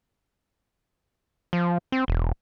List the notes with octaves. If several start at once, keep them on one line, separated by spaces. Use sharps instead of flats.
F3
C4
E1